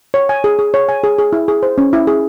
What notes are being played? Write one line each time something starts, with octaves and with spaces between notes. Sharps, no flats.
C#5
G#5
G#4
G#4
C#5
G#5
G#4
G#4
E4
G#4
C5
C#4
E4
G#4